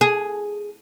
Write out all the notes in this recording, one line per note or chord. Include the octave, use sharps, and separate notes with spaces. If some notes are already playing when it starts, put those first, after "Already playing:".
G#4